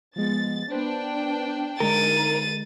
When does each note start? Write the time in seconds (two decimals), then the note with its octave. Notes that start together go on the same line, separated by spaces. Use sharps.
0.16 F3 G#3 B3 A6
0.71 B3 D4 B4 C5 G5
1.80 D3 G#3 D#4 A#4 A6 D#7